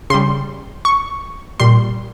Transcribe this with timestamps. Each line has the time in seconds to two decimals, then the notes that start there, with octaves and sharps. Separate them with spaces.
0.10 C#3 G3 C6
0.85 C#6
1.60 A#2 G3 C6